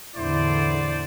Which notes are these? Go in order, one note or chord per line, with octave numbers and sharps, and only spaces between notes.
E2 A2 D3 E4 C5 D5